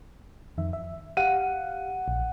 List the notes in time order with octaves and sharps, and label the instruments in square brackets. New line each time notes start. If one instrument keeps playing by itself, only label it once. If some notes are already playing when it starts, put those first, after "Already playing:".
[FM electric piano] F2 D#3 E5
E5
[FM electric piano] G4 F5 [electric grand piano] F#5 D#7
[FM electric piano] A#1